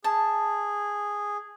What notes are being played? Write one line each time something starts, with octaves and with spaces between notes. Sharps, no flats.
G#4 A5